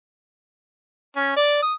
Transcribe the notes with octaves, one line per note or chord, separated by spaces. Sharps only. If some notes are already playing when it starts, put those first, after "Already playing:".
C#4
D5
D#6